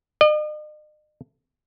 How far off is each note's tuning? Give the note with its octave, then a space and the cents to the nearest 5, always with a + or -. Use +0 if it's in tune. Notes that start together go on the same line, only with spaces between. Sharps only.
D#5 -45